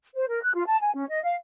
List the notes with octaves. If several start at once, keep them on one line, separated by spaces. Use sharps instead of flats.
C5
A#4
F#6
F4
A5
G#5
C#4
D#5
F5